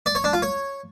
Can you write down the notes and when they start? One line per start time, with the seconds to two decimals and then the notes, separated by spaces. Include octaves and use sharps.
0.06 D5
0.15 C#5
0.24 D4
0.33 F4
0.42 C#5